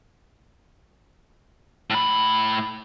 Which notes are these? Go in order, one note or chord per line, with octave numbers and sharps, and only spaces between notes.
A2 B5